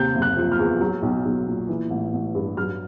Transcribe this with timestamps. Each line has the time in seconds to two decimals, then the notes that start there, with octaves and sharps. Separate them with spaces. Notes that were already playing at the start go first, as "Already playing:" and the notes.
Already playing: D#2 C3 G6
0.15 F#1
0.22 F#6
0.37 F3
0.52 F6
0.59 E2
0.81 F#3
1.02 B1
1.25 B1
1.47 A#2
1.69 E3
1.90 A1
2.13 A1
2.35 G2
2.57 F#3 F6